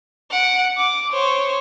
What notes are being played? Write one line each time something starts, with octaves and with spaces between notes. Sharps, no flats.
F#5 D7
D6
C5 C#5